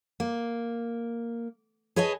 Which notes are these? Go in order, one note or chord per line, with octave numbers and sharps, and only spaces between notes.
A#3
G#4 B4 C#5 D#5 G#5 A5